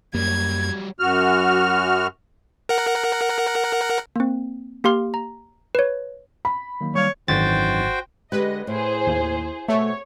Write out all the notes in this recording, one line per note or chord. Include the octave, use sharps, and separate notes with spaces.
F#2 F#3 G3 A#3 G#6
F#2 F#4 F6
A#4 F#5
A#3 C4
A#3 G4 F5 C6 F6
A#5
B4 C#5
B5
D#3 F#3 A#3
G3 C#5 F5
G#1 F#2 D#3 E3 F#4 C5 G5 A6
D3 G#3 G4 B4 D#5
A2 G#4 C5
D#2
B2 A3 C5 C#5 E5